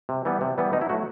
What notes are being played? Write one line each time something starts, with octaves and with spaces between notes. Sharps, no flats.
C3
E3 G3 B3
C3
E3 G3 B3
B2 D#4
E4
F#3 A3 F#4